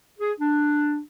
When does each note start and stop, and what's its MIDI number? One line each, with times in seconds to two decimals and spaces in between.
0.19 0.31 68
0.39 1.00 62